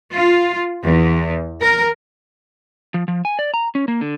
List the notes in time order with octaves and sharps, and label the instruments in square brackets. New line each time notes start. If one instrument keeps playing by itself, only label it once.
[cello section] F4
E2
A#4
[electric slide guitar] F3
F3
G#5
D5
A#5
C#4
A#3
D3